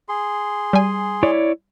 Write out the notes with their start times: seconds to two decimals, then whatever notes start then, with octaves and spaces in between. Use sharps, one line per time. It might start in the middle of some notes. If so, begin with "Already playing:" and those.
0.09 G#4 C6
0.73 G3 G#5
1.23 E4 C#5 D5